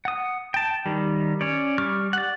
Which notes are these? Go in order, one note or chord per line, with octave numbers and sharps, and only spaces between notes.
F#5 D#6
G5 A5
D#3 G3
C#4 C#5 D5
G3 C#6 D6 F6
D5 F#5